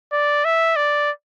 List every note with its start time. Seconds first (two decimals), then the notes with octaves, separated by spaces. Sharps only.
0.12 D5
0.45 E5
0.76 D5